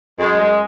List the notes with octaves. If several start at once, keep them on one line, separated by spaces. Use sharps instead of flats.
F#2 G#3
G#3